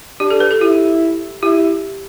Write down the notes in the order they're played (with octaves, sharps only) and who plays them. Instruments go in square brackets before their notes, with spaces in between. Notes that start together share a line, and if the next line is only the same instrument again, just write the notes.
[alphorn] D4 [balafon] G4
[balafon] A4
B4
A4
[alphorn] E4 [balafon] G4
[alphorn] E4 [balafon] G4